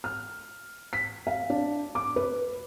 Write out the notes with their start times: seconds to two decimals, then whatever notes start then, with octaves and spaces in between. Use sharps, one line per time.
0.04 F6
0.93 B6
1.27 F5
1.50 D4
1.95 D6
2.16 B4